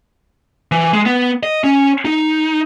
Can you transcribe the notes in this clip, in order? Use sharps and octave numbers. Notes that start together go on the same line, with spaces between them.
E3
G#3
B3
D#5
C#4
D#4